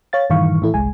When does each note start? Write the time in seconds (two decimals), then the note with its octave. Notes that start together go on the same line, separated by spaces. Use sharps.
0.13 C#5 F5 A6
0.30 G2 A#2 D#3 E3 F5 C#6
0.62 A2 E3 E4 A4
0.74 G1 C2 G#3 G#5